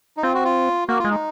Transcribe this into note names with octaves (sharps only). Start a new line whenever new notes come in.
D#4
C4 F4
F#4
F4
A#3 F#4
F4
G#3
D#4